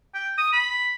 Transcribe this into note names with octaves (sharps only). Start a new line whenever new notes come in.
G5
D#6
B5